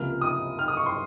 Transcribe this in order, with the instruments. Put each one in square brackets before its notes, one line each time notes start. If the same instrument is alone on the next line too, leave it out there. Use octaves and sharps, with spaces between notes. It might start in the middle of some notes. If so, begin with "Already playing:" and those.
Already playing: [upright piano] C#2 C3 F3 A#3 F6
D#6
F6
D#6
C#6
C6